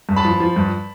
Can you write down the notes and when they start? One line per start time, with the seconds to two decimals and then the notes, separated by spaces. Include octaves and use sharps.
0.09 G2
0.16 A5 B5
0.25 F3
0.40 F3
0.56 G2